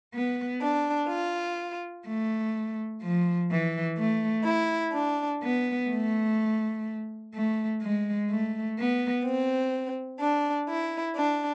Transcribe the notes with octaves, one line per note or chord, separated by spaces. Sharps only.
B3
D4
F4
A3
F3
E3
A3
E4
D4
B3
A3
A3
G#3
A3
B3
C4
D4
E4
D4